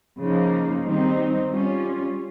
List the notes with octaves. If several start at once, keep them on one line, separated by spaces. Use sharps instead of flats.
C#3 F3 A#3 D#4
D#3 G3 C4 D#4
G3 C#4 F4